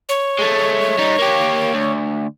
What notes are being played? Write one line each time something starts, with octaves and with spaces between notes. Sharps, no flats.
C#5
G#3 A3
G3 D#4
A#3 G4
D2